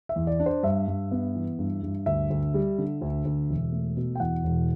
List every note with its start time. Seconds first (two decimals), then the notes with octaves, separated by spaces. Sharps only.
0.09 E5
0.16 E2
0.27 D5
0.40 D4
0.46 C5
0.63 G2 E5
0.88 G2
1.11 B3
1.35 E3
1.59 G2
1.83 G2
2.06 D2 E5
2.30 D2
2.54 G3
2.78 D3
3.01 D2
3.25 D2
3.50 E1
3.72 A3
3.97 B2
4.15 G5
4.20 E2 F#5
4.44 E1